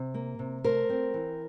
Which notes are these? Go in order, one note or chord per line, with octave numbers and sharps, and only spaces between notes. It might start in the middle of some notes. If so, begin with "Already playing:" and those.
Already playing: C3
A#3
C3
A3 A#4 C5
C4
E3